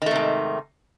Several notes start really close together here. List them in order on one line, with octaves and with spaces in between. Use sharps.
D#3 A3 C3 G#2